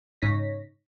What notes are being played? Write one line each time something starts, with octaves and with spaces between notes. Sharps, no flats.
G#2 C#3 D#4 C#5 A#6 B6